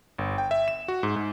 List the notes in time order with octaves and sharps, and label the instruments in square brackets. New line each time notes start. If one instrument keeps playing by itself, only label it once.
[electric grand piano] G1
G5
E5
E7
F#4
G#2
G#2